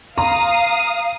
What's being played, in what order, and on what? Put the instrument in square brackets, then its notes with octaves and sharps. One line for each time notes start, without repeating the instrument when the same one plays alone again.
[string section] F5 D#6 [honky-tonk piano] A#5